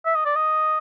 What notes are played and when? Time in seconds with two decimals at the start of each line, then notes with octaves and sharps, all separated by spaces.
0.05 E5
0.15 D#5
0.25 D5
0.36 D#5